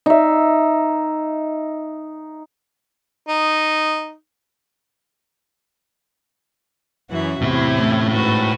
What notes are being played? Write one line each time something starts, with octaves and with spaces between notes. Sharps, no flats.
D#4 E5
D#4
F#2 E3 C#4 F#4 E5
E2 A2 C3 E4 E5
A3 C#4
G#2 F#4 B4